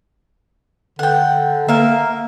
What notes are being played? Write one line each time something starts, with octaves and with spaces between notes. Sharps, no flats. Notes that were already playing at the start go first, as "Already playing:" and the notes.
D3 F#5 G5
A#3 E5 F5